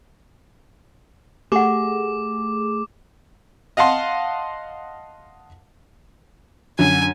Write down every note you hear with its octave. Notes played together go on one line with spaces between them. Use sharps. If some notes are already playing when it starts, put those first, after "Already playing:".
A3 G4 G#4 F#5 D6
D#5 F5 F#5 A5 C6
F#2 D3 G#5